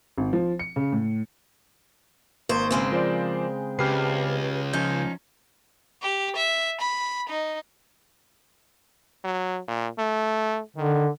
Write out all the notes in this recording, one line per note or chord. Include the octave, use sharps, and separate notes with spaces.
G#1
F3
C#7
C#3
A2
G#1 A#3 C5 C#6
C#3 G#3 C4
F3 A#4 C5 D5
C#2 G4 B4 F6 C7
F3 C#4 D#4 G6
G4
E5
B5
D#4
F#3
A#2
A3
D3 D#3